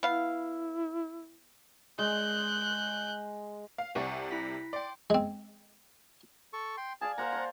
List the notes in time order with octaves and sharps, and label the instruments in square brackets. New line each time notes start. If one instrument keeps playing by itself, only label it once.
[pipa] B3 F5 [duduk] E4
[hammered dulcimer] G#3 [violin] F#6 G6
[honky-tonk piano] F5
[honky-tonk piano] C2 C3 D5 [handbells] F#5 G#5 C#6
[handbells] E4 B6
[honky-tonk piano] D5 [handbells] G5 C6
[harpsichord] G#3 C4
[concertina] A4 C#6
G5 C6
[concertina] G#4 A5 [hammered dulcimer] D5 F5 G#5
[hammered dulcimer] A#3 C5 F5 [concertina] F#5 A#5
[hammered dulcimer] C5 A5